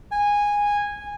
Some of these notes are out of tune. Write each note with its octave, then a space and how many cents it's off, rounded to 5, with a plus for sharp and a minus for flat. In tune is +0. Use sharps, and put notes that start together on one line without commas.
G#5 -15